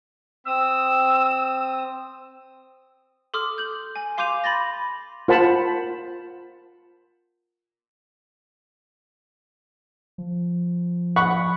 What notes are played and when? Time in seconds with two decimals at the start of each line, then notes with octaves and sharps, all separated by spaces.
0.47 C4 D#6 E6
3.34 A4 C6 D6 D#6 F6
3.58 G6 F#7
3.96 G#5
4.18 F5 C6 D6 G6 D#7 F7
4.44 B5 C6 A6 A#6
5.28 F4 A#4 C5 F#5 A5 B5
10.18 F3
11.16 F#5 B5 C#6